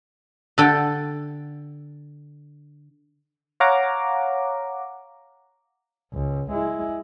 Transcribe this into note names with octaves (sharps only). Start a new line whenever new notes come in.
D3 A4 G5
C#5 F5 F#5 A#5 D6
C#2
G#3 E4